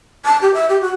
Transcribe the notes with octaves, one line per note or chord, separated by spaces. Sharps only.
A5
G4
E5
G4
F#4